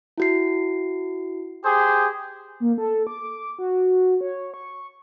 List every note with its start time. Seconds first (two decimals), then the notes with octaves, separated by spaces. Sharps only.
0.18 E4 F#4 C7
1.65 G4 G#4 C5
2.60 A#3
2.78 A4
3.07 D6
3.59 F#4
4.21 C#5
4.54 C#6